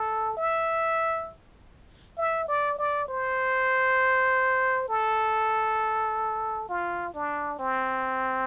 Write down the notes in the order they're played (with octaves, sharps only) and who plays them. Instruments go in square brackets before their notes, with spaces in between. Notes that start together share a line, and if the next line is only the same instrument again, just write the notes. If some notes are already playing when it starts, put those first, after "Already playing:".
Already playing: [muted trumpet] A4
E5
E5
D5
D5
C5
A4
F4
D4
C4